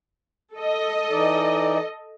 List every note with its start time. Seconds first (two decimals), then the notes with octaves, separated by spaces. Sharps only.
0.55 A4 D#5
1.11 E3 D#4 D5